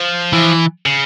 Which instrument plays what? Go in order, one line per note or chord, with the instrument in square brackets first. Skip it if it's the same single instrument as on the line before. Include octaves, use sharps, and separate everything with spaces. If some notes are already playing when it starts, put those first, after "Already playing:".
Already playing: [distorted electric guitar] F3
[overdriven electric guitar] E3
[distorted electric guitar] C#3